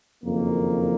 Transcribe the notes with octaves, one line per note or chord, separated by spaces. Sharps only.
F#1 F2 D#3 A#3